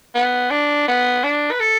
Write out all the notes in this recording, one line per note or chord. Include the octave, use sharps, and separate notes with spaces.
B3
D4
B3
D4
B4
A4